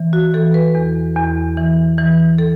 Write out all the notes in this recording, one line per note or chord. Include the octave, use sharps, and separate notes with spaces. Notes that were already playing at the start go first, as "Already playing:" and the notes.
Already playing: E3
F#4
E3 A4
B4
E2
E2
E3
E3
A4